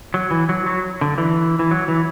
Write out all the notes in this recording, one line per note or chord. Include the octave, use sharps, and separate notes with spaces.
F#3
E3
F#3
F#3
D3
E3
E3
F#3
E3